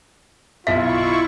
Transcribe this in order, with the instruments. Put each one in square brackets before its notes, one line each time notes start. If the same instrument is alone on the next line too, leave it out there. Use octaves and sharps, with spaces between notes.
[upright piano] B1 B6 [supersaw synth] E4 C#6 [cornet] F4 [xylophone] E5